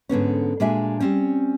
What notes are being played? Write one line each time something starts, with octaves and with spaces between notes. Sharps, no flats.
G#2 D3 B3 C#4
A#2 G#3 D4 F#4 E5 G#5
G3 C4 C#4